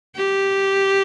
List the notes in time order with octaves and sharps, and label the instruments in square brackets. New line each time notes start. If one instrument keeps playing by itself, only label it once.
[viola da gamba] G4